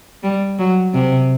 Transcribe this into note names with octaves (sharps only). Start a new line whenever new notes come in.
G3
F#3
C3